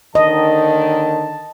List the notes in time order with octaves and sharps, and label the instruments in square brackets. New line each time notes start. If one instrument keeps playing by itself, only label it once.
[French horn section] D#2 D3 D#3 [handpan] D#5 [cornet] A5